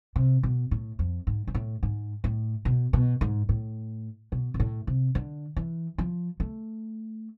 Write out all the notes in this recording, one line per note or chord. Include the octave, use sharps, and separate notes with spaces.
C3
B2
A2
F2
G#2
G#2
A2
G#2
A2
B2
B2
G#2
A2
B2
B2
A2
C3
D3
E3
F3
A3